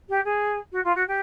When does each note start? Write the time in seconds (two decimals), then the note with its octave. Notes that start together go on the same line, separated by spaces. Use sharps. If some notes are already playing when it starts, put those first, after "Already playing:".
0.09 G4
0.24 G#4
0.72 F#4
0.84 F4
0.95 F#4
1.07 G4